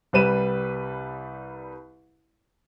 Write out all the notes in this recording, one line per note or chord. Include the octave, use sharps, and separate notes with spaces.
C2 G3 B4 D#7 E7